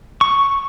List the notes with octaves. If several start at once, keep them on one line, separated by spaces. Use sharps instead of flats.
C#6